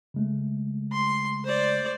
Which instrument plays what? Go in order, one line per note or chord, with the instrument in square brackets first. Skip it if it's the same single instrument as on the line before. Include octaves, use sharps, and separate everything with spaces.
[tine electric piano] C#3 G#3 A3
[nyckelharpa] C6
C5 D5